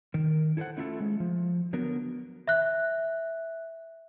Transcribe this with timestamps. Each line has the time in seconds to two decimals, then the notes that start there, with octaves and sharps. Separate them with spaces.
0.14 D#3 A#4
0.57 E4 A4 B4 C5 F#5
0.77 A3 C#4 E4 F4 G4 A4
1.00 G#3
1.20 F3
1.73 D3 F#3 B3 A#4
2.47 E5 F#6